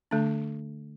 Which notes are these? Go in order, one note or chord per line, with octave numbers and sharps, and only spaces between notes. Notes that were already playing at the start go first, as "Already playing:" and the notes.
D3 A3 D4